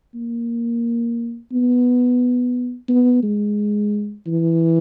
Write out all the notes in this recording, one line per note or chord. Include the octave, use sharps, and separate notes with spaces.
A#3
B3
B3
G#3
E3